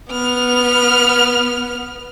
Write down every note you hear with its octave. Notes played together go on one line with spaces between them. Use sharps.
B3 F6